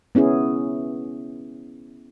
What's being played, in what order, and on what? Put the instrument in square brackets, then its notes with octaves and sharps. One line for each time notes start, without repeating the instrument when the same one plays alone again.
[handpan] B3 C#4 E4 G#4